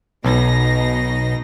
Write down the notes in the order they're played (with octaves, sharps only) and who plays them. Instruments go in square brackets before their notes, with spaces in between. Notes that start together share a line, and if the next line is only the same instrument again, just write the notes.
[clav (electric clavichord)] B1 [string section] B2 D#4 A#6